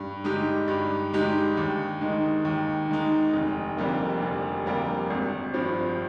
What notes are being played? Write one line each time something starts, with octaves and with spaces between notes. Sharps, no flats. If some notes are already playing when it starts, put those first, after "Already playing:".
Already playing: G2
D3 G#3 D#4 G4
G2
D3 G#3 D#4 G4
D#2
D#3 G#3 D#4
D#2
D#3 G#3 D#4
F1
F2 D3 G3 A#3
F1
F2 D3 G3 A#3
G#1
G2 F3 C4